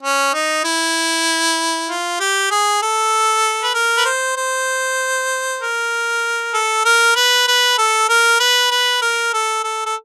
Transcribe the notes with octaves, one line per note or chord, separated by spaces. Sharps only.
C#4
D#4
E4
F4
G4
G#4
A4
B4
A#4
B4
C5
C5
A#4
A4
A#4
B4
B4
A4
A#4
B4
B4
A#4
A4
A4
A4